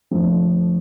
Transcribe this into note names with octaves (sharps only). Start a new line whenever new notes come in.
F2 D3 F3 A3